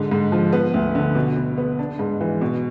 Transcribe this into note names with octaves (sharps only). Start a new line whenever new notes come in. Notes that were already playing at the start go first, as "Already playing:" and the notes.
Already playing: G#2 D3
G#2
F3
B3
D2
D3
B2
B2
B3
D4
G#2
E3
B2